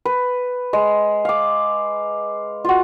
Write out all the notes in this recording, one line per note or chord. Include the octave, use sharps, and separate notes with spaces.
B4
G#3
F5 D6
F4 F#4